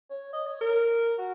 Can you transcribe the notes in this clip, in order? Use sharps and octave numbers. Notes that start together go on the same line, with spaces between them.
C#5
D#5
C#5
A#4
F#4